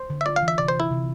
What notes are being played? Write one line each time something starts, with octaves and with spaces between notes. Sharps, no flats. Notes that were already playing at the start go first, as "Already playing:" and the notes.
Already playing: C5
D3
E5
F4 D5
F5
E3
E5
C3 D5
C5
C3 E4
C3